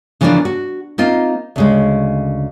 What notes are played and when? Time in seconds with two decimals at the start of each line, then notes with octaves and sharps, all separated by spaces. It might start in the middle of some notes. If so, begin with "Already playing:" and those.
0.21 C#3 E3 F3 A#3 B3 D4
0.45 F#4
0.98 A#3 C4 D#4 F4
1.56 D2 C#3 G#3